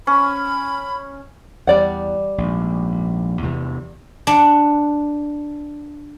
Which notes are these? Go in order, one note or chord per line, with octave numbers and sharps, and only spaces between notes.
C#4 B5
E2 G3 D5 F#5
A#1 G#2
E2 C3 E3
D4 F#5